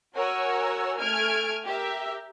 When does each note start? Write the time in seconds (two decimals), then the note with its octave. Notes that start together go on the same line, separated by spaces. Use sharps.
0.15 F#4 A#4 C#5 F#5 G#5 E6
0.99 A3 G#5 F6 G#6 D7
1.65 G4 A#4 E5